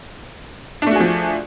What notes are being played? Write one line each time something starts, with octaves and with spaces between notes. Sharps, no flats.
F3 A3 D4 F#4 G#4